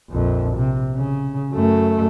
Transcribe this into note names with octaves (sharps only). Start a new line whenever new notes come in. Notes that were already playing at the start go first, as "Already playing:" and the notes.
A#1 F2
C3
C#3
F#2 A3